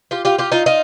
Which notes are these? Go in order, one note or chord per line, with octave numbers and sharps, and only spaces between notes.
F4 G4
F4 G4
F4 G4
D#4 F4
D#4 F4